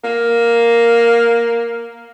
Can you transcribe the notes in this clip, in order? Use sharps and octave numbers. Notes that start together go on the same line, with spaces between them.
A#3